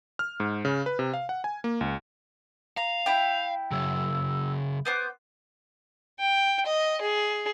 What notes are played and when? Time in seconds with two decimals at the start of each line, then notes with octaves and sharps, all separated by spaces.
0.19 F6
0.40 G#2
0.65 C#3
0.86 B4
0.99 C3
1.14 F5
1.29 F#5
1.44 G#5
1.64 A#3
1.81 C#2
2.77 F5 A#5 F7
3.06 E4 G5
3.72 C#3 F#3 E6
4.85 B3 C5 D6 G6
6.19 G5
6.66 D#5
7.01 G#4